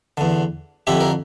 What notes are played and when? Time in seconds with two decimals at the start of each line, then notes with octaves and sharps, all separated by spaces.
0.17 E2 D3
0.87 F2 D3 E4 G4
1.01 A#4